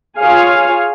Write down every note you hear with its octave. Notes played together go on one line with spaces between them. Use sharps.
F4 G#4 C#5 F5 G#5